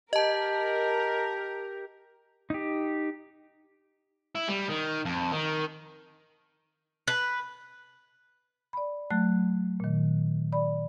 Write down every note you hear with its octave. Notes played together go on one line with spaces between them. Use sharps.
G4 A#4 D#5 A5
D#4 G4
E4
G3
D#3
F2
D#3
B4
D5 B5
F#3 A3 F#6
A#2 D#3
D5 B5